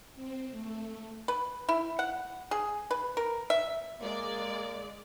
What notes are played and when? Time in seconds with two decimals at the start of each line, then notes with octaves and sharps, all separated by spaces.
0.15 C4
0.51 A3
1.28 B4
1.69 E4
1.99 F#5
2.51 G#4
2.91 B4
3.17 A#4
3.50 E5
4.01 G#3 A#3 D5